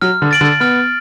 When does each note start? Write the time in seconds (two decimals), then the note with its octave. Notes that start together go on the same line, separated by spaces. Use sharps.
0.02 F#3 F6
0.22 D3
0.31 A6 D7 F#7
0.41 D3
0.60 B3 F6